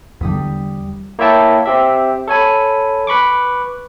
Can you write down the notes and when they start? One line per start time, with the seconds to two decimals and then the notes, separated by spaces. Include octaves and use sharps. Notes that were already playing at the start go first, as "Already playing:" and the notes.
0.21 E2 D3 G3 D#6 B6
1.19 A#3 E4 C#5 E5 G5 A5
1.66 C4 G4 E5
2.28 A4 C#5 G#5 B5
3.07 B4 B5 C#6 D6